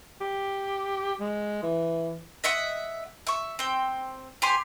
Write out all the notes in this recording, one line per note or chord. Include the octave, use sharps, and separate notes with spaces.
G4
G#3
E3
D#5 E5 F#5 D#6
E5 C#6
C4 G5
G4 C5 G#5 C6